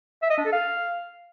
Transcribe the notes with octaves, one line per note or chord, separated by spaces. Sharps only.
E5
D#5
D4
A4
F5